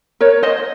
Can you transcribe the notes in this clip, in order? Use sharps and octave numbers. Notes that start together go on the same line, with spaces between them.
A#4 C#5
C5 D#5